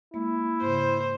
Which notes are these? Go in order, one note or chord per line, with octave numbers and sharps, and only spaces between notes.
G#3 A#3 E4
G#2 C#3 C5